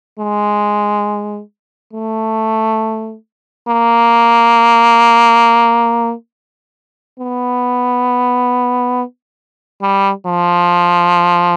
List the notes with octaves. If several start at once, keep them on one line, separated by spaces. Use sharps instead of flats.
G#3
A3
A#3
B3
G3
F3